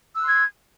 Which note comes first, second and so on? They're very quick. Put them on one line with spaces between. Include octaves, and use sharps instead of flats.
E6 F#6 C6 G#6